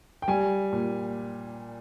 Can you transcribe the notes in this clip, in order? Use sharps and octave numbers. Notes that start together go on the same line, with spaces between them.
G5
G3 G#5
A#2